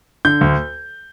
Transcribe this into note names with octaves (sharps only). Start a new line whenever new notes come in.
D3 G6
D2